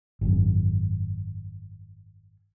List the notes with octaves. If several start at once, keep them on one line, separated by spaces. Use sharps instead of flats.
G#1 F#2